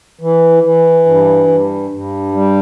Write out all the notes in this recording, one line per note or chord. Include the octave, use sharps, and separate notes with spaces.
E3
E3
G2
G2
G2
G3